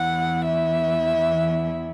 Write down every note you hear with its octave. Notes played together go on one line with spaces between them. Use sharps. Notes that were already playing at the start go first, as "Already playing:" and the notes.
Already playing: E2 E3 B3 E4 F#5
E5